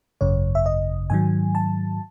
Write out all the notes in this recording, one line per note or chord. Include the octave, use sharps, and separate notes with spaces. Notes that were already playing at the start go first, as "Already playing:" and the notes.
G#1 F#2 C#3 C#5
E5
D#5
G#2 D#3 F#3 G#5
A5